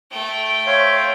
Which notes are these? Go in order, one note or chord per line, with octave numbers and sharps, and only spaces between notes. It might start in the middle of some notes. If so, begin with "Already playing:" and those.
A3 G5
C5 C#5 E5 F5